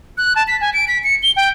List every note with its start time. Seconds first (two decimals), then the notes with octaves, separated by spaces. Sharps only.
0.18 F#6
0.36 A5
0.48 B6
0.61 G#5
0.74 D7
0.88 B6
1.04 C#7
1.23 G7
1.36 G5